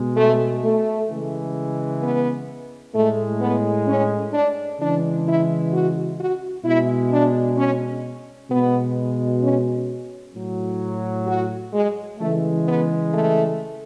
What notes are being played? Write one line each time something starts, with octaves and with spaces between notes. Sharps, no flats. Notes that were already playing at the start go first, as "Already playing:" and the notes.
Already playing: B2 G#3
A3
A3
C#3 E3 G#3
B3
A2 G#3 A3
B3
C#4
D4
C#3 E3 G#3 D4
E4
F#4
F#4
B2 G#3 E4
D4
C#4
B2 G#3 B3
C#4
A2 F#3
F#4
G#3
C#3 E3 G#3 A3
B3
A3